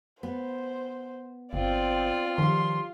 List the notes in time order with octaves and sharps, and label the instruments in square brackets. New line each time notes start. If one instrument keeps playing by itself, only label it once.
[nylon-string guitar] B3 [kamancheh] C5
[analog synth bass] G1 [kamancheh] C4 D5 [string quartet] F4
[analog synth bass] D#3 [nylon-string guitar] F3 G3 [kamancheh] C6